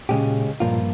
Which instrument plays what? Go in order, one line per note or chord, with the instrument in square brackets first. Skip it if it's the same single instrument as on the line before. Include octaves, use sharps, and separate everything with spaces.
[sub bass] A#2 [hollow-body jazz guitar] C#3 G#3 C#4 G4
[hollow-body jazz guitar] G2 F3 A#3 F4 [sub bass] A#2